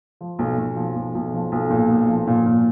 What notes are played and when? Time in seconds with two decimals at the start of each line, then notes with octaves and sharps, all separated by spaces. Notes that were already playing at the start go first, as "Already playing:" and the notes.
0.21 F3
0.39 B1
0.58 B1
0.77 F3
0.96 B1
1.15 B1
1.33 F3
1.52 B1
1.70 A#2
1.89 B1
2.09 F3
2.27 A#2
2.46 A#2